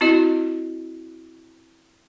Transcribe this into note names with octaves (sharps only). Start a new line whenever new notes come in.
C4 E4 F#4 D#5